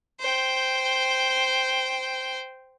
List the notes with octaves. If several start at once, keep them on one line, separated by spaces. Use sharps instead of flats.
C5 G5